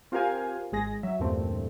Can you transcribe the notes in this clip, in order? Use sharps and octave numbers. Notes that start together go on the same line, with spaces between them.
C4 F4 G4 A#4 F5 G#5
G#1 G#3 G#4 A#6
F#3 E5
E2 G2 A#2 A3 C4